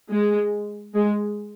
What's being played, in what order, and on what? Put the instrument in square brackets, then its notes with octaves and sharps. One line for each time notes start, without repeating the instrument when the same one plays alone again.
[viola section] G#3
G#3